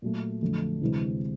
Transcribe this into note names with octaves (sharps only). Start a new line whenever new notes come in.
A#2 F#3 A3
F2 D3 F#3 A3
D2 C3 E3 G#3 C4